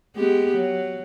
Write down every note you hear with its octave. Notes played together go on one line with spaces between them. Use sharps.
G#3 B3 G4
F#3